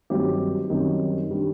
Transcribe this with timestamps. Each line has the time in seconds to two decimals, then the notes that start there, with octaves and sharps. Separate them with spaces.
0.10 G2 D#3 F#3 C4 G4
0.70 F#2 D#3 G3 C4
1.29 D#3 G3 D4